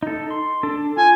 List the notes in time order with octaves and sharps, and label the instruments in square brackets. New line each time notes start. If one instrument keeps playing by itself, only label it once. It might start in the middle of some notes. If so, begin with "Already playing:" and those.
[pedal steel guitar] D#4 A4
C6
D4 A4
[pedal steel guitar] F4 [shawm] G#5